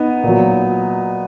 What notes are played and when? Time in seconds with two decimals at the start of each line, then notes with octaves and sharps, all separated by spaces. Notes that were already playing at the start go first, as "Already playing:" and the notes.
Already playing: B3 D#4
0.23 A#2 F#3